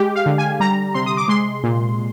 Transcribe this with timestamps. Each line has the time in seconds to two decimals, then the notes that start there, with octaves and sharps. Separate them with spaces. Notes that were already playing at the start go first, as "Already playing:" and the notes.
Already playing: G#3 G4
0.15 F5
0.26 D3
0.38 G#5
0.60 G3 A#5
0.94 C3 C6
1.06 D#6
1.17 D6
1.28 G#3 C6
1.64 A#2